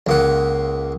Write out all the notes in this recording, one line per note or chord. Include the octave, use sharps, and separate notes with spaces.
C#2 A#3 F#5